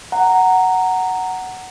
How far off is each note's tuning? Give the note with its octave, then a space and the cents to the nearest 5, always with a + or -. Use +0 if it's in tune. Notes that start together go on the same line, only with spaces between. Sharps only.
F#5 +10 A#5 -10